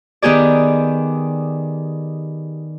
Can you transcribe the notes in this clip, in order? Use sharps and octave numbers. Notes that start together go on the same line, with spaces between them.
D#3 B3 G4 G#4 D5